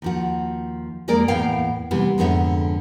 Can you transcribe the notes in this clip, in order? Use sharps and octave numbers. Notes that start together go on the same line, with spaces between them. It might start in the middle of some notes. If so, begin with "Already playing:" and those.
D#2 F3 F#4
F2 G#3 A#3 A#4 D5
E2 A2 B3 F5 G5
C3 E3 G3 B3
F2 G#2 D3 B3 C#5 E5